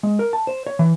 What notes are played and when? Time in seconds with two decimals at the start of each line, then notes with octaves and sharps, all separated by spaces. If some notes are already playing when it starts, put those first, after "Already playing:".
0.03 G#3
0.19 A#4
0.33 A5
0.47 C5
0.67 C#5
0.79 E3